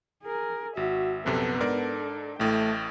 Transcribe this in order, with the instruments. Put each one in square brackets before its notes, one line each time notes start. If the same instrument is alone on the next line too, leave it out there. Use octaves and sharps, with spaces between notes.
[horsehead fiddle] G#4 A#4
[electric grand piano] G#1 [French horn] F#4 [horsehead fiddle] E5
[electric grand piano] A#1 F#2 C3 [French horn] B3 [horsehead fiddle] A4
[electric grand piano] G#2 A#4 D5 [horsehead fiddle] D4 A4
[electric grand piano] A1 A2 [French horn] A3 [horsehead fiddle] G5